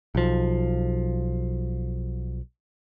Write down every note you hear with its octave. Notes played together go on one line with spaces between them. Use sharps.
B1 F3